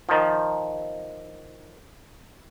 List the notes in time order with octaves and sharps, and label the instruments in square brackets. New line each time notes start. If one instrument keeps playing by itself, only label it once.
[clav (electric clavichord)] D#3 F3